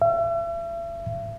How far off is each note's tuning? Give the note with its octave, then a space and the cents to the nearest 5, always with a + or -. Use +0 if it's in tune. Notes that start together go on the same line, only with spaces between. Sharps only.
E5 +40